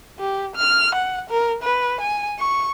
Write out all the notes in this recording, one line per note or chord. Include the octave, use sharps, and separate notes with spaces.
G4
F6
F#5
A#4
B4
G#5
C#6